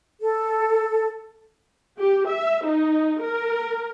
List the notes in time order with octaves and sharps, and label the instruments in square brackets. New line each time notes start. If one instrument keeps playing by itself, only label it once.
[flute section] A4
[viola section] G4
E5
D#4
A#4